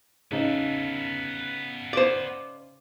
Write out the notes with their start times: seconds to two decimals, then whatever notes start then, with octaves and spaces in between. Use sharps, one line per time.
0.31 C#3 B3 D#4 A4
1.93 C5 D5